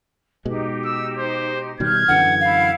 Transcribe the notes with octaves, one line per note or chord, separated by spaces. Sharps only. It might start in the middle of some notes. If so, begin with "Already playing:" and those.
B2 G#3 D#4 G4
E6
C5
B2 D#3 G3 F6 G6 G#6
F#2 D3 E3 F#5
E4 F5 F#5